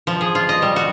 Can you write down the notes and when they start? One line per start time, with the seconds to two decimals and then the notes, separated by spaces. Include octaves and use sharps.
0.07 F3
0.21 G#4
0.35 F4
0.49 D#5
0.62 G3
0.76 F#4